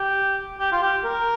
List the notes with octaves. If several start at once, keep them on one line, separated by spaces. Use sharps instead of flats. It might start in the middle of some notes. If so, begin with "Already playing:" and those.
Already playing: G4
G4
F4
G4
A#4